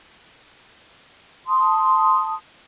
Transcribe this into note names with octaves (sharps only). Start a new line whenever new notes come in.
A5 C6 D#6